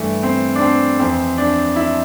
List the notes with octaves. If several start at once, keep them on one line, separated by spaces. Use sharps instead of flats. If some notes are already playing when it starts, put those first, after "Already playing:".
Already playing: G2 E3 A3
C4
D4
C4
F2 E3 C4
D4
E4